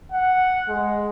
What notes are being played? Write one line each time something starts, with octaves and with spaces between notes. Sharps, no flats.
F#5
G#3